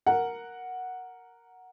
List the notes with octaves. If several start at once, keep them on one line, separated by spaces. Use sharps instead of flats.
A#4 F#5